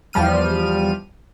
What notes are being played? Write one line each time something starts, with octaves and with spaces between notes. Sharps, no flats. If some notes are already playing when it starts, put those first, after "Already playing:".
E2 F3 G3 F6 D#7